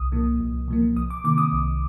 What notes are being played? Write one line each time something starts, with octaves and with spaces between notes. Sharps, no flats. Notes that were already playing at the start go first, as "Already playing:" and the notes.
Already playing: C2 D#6
A#2 F3 A#3
C2
A#2 F3 A#3
C2 D#6
D6
C3 D#3 A#3 D6
D#6
C2